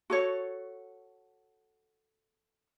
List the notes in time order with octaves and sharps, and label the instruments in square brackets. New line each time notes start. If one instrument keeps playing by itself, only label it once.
[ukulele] F#4 A4 C#5